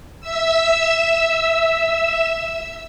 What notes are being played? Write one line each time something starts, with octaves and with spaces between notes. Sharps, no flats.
E5 E6